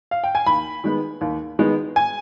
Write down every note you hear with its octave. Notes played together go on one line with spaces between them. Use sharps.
F5
G5
G#5
D#2 B5
D#3 G#3 B3
D#2
D#3 G#3 B3
G#5